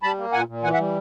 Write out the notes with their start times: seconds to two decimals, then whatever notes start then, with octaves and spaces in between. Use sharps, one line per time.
0.03 G3 A5 B5
0.18 A#3
0.33 A#2 F#5 G#5
0.48 A#2
0.63 E3 F#5 G#5
0.74 E5 F#5
0.79 G3